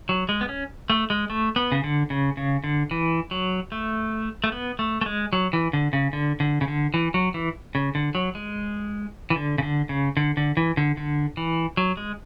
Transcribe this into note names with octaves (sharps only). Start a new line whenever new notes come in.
F#3
G#3
B3
C#4
A3
G#3
A3
B3
C#3
D3
C#3
C#3
D3
E3
F#3
A3
A3
B3
A3
A3
G#3
F#3
E3
D3
C#3
D3
D3
C#3
D3
E3
F#3
E3
C#3
D3
F#3
G#3
E3
D3
C#3
D3
C#3
D3
D3
E3
D3
D3
E3
F#3
G#3